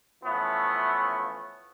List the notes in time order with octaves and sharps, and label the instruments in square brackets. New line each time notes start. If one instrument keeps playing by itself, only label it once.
[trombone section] E3 F3 A3 B3 C#4